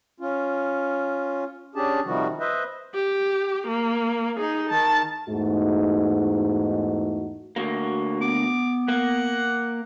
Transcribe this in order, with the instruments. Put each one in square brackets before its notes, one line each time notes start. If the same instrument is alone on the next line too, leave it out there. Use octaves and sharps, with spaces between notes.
[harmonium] C#4 F4
C#4 D4 G4 G#4 A5
C3 D#3 F3 G3 F#4
B4 C5 D#5 E5
[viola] G4
A#3
D#4 G#4
D#3 A5
[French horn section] E2 G#2 A3 D#4 F#4
[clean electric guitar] D2 A#3 [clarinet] F#4
[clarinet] B3 [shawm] D6
[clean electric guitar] A#3 [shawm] F#5